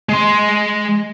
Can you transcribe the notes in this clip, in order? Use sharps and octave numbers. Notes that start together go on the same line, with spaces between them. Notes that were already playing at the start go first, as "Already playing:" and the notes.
G#3 C6